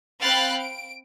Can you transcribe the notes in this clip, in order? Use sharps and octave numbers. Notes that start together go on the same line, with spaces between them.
C4 F5 G5 B5 F#6 A6
D7